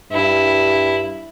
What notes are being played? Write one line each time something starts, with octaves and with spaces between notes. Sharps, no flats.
G2 E4